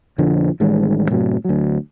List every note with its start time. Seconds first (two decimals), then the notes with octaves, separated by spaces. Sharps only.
0.18 F2 B2 D3 F3
0.60 A1 D#3 G3 G#3
1.10 F#2 A2 C3 F#3
1.45 D2 F#3